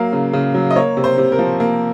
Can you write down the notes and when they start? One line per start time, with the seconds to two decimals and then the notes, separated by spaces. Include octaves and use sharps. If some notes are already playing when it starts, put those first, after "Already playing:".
Already playing: F#3 A#3 F5
0.13 C#3
0.33 C#3
0.54 F#3
0.71 D#5
0.76 A#3 C#5
0.97 C3
1.04 C5
1.18 C3
1.32 A#4
1.39 F3
1.60 A#3